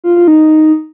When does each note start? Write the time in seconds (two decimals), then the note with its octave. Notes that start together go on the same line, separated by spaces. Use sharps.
0.04 F4
0.16 F4
0.28 D#4